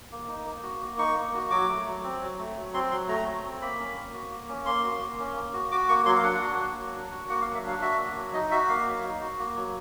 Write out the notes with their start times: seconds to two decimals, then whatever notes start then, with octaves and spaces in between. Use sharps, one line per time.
0.12 A#3
0.28 D#4
0.45 A#3
0.63 F#4
0.81 A#3
0.98 D#4 C#6
1.16 A#3
1.34 F#4
1.50 F#3 D6
1.69 A3
1.86 F#3
2.03 C4
2.21 F#3
2.38 A3
2.57 F#3
2.74 C4 C6
2.91 F#3 C6
3.08 A3 A#5
3.26 F#3
3.44 C4
3.62 A#3 B5
3.79 C#4
3.96 A#3
4.13 F#4
4.31 A#3
4.49 C#4
4.66 A#3 C6
4.84 F#4
5.01 A#3
5.19 C#4
5.36 A#3
5.53 F#4
5.71 F#4 D6
5.89 A#3 C#6
6.06 F#3 C6
6.16 F5
6.23 D4 F#5
6.42 F#4
6.59 A#3
6.77 F#3
6.94 D4
7.11 F#4
7.29 A#3 F#5
7.41 F5
7.46 F#3
7.54 E5
7.63 D4 F5
7.82 F#4 E5
7.98 A#3
8.16 F#3
8.34 D#4 D#5
8.51 F#4 E5
8.69 A#3 F5
8.86 F#3
9.03 D#4
9.21 F#4
9.39 A#3
9.56 F#3